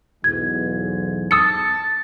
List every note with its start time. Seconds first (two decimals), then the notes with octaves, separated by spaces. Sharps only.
0.24 B1 E2 G#2 G#6
1.31 A5 D#6 E6 C#7